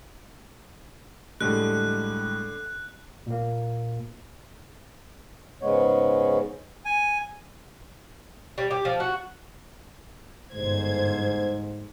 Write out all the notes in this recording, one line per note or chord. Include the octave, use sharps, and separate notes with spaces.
A2 D3 G3 G#3 F#6
A#2 A#3
G#2 C#3 G#3 B3 C#5
G#5
G3
G4
F3
F#4
G1 G#2 C5 G#6